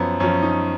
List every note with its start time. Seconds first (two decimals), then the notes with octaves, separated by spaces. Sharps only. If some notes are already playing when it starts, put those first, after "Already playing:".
Already playing: F#2 F3 B3
0.20 F#2 F3 C#4
0.43 D#4